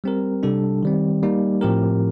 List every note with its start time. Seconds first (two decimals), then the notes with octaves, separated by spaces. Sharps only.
0.04 G3 C4 G4 A#4
0.43 C3 G3 D4 A4
0.83 D#3 G3 C4
1.22 G3 A#3 D#4
1.61 A2 F3 C4 G4 A#4